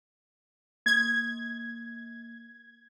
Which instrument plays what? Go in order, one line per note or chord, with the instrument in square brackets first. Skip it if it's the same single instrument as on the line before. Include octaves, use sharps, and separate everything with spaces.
[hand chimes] A#3 [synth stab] G#6